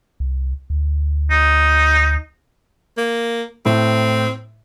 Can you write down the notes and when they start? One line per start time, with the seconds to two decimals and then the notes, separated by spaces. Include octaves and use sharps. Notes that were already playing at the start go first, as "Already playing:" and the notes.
0.20 C2
0.70 D2
1.30 D#4
2.97 A#3
3.66 A2 C4